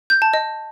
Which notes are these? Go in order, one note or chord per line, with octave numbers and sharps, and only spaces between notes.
G6
A5
D#5